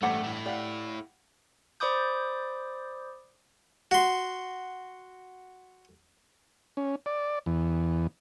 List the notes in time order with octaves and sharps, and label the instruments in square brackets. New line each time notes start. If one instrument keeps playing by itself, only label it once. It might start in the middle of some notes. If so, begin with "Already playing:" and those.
[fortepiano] A1 G2 D6 [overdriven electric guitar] A3 [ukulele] C5 F#5
[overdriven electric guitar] A3 E4
[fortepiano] G4 F5 F#5 [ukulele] D5
[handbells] C5 D5 B5 D6 D#6 G6
[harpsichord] F#4 C6
[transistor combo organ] C#4
D5
E2